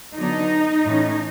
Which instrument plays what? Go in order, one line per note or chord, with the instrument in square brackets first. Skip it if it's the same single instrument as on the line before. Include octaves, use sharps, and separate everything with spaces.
[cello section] D3 F#3 B3 D4 D#4
A2 E3 A3 C#4